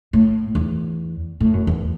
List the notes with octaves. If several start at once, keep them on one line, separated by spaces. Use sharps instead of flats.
A2
E2
A2
F#2
E2